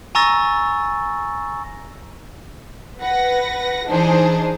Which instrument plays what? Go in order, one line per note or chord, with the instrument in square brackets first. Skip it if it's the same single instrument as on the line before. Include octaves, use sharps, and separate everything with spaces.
[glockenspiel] G#5 A#5 C#6 E6 A6 A#6
[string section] B4 F#5 A#6
E3 D4 D#4 G#4 C5